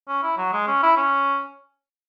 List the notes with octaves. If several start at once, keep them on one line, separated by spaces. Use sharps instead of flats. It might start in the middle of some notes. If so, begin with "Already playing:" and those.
C#4
E4
F#3
G#3
C#4
E4
C#4